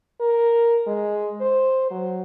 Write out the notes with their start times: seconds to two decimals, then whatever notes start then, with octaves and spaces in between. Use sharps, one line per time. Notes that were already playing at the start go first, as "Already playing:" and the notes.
0.21 A#4
0.87 G#3
1.41 C5
1.91 F#3